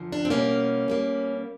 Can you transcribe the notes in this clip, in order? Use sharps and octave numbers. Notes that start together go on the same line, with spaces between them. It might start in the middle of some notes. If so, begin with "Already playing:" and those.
Already playing: F#2 D3 F3
D4
C4
B2 G3 A#3 C#4
B2 G3 A#3